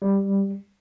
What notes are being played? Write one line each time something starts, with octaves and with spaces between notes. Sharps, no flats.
G3